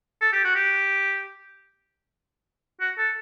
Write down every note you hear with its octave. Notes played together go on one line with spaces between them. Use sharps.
A4
G4
F#4
G4
F#4
A4